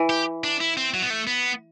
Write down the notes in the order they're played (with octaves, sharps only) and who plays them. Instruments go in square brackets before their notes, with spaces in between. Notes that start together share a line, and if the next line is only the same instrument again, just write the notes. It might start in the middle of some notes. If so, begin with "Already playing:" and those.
Already playing: [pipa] E3
[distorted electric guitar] G4
D4
E4
C4
F#3
B3
A3
B3